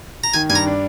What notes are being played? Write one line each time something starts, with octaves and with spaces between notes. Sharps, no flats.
A#5
D#3 G#5
G2 G#5
A#5
D4